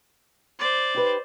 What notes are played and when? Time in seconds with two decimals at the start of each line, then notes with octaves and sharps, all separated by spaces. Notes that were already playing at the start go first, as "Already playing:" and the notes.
0.59 C5 D5
0.94 D#4 G4 B4